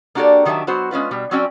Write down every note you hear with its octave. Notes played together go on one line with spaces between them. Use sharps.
A#3 D4 F#4 G4 A4 D5
D#3 F#3 G4 C5 E5 A5
F#3 B3 F#4 C5
G#3 C#4 F4 B4
B2 G3
F#3 C4 C#4 F#4 D5 G5